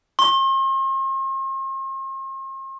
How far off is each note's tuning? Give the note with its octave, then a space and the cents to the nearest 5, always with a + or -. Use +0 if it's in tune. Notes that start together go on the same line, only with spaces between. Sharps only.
C6 +45